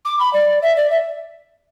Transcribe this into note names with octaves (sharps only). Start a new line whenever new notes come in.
D6
B5
D5
E5
D5
E5